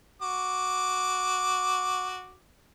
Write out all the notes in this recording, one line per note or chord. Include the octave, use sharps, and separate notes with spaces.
F#4 D6